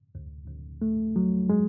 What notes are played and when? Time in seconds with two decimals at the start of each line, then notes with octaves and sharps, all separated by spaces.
0.15 D2
0.48 D2
0.82 A3
1.16 F#3
1.49 G#3